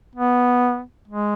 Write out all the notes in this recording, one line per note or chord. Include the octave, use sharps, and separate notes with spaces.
B3
G#3